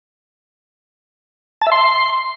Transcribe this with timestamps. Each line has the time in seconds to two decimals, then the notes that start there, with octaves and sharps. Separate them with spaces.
1.62 A5
1.67 E5
1.72 C6